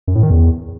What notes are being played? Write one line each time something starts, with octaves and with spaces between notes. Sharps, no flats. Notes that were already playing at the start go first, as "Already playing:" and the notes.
F#2
A2
D#3
E2